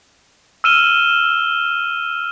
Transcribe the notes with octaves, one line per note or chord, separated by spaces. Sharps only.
E6 F6 D#7 E7 G7